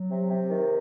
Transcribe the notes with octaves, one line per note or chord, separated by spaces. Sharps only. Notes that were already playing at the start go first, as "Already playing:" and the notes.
Already playing: F#3
C3
C3
D#3